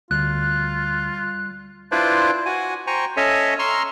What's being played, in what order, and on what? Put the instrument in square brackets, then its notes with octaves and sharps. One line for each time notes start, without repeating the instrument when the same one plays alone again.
[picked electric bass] D2 [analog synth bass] G3 [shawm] F4 [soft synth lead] F#6
[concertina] D4 E4 F4 B4 C5 D5
F#4 G#5
C5 G5 G#5 A#5 C#6
C#4 A4 C#5 D#5 E5 G#5
A#5 C6 C#6 E6 F6